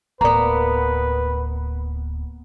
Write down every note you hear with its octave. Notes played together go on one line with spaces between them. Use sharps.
D1 A#3 B3 B4 D5 A#5